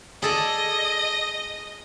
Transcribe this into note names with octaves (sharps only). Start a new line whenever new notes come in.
G#4 A4 D5 D#5